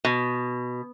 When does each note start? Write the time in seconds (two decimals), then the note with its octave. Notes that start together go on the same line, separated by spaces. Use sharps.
0.05 B2